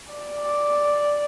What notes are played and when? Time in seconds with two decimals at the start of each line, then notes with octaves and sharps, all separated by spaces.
0.12 D5